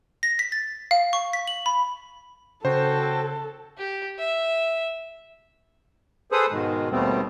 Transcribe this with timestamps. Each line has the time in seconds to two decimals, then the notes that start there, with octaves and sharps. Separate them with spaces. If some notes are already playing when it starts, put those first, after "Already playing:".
0.23 A#6
0.39 B6
0.52 A6
0.91 F5
1.13 C#6
1.33 B6
1.47 F#7
1.66 B5
2.65 C#3 F#4 A4 C5 G5
3.78 G4
4.19 E5
6.32 G#4 A4 B4 C5 D#6
6.51 G#2 B2 D#3 G#3
6.91 D#2 B2 G3 A3 B3 C4